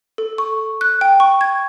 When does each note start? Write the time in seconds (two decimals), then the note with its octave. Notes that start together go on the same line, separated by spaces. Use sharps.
0.18 A4
0.38 C#6
0.81 F#6
1.01 G5
1.20 C#6
1.41 G#6